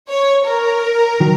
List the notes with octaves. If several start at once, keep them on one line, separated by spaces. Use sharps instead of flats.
C#5
A#4
D#3 F#3